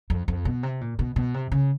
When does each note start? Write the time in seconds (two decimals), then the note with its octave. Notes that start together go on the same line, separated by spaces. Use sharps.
0.10 F2
0.28 F2
0.45 B2
0.63 C3
0.81 A#2
0.99 B2
1.16 B2
1.34 C3
1.52 C#3